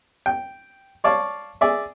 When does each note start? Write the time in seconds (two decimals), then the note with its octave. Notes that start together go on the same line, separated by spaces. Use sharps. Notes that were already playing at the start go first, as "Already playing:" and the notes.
0.26 G5
1.04 C#5 D5 F5 A5 C#6
1.61 G#4 D5 E5